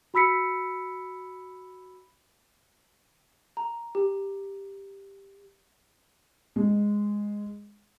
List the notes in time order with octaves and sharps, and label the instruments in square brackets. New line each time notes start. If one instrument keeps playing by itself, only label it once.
[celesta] F#4 B5 E6 B6 C#7
[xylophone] A#5
G4
[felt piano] G#3